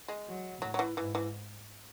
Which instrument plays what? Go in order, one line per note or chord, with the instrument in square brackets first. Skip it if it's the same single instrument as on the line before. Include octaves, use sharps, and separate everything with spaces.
[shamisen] G#3
[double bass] F#3
[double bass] A2 [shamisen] F#3
[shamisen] F#3
E3
[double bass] G#2 [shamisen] E3
[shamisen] E3